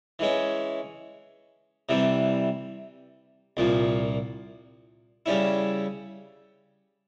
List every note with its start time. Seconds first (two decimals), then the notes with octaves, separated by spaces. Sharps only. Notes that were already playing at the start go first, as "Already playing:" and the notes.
0.19 E3 G#3 C#4
1.89 C3 E3 G3
3.57 C2 A#2 F3
5.26 C#3 G3 C#4 E4